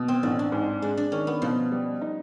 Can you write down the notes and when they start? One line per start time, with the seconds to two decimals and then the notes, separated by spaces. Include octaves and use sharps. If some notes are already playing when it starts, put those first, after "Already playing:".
Already playing: B2
0.08 C4
0.23 A1 D4
0.39 D4
0.52 G#2
0.82 G#3 D4
0.97 D4
1.12 D#3 C#4
1.27 B3
1.42 B2 F3
1.72 G3
2.01 D#4